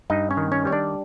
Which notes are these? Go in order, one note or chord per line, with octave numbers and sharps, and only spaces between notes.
G2 D#4 D#5
C#4 C#5
D#3
C#4 C#5
G3 C#5
D4 D5